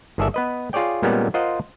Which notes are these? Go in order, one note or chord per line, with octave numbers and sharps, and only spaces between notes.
G1 D#3 G#4 A4 D5 E5
B3 B4 D#5
F4 G#4 C#5 D5 G5
A#2 G3 G#3 A#3 B3 C#4
F4 A#4 C5 D#5 F#5